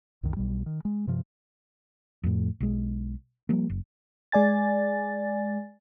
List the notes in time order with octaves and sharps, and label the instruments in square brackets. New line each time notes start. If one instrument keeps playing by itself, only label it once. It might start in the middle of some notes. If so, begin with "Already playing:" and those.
[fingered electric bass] C2 F#2 D#3
B1 B2 G3
D#3
G#3
G2 C3 F3
F2 A2
B1 G#3
F3 G3 A#3
F#1
[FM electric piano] G#3 D5 G#5 A6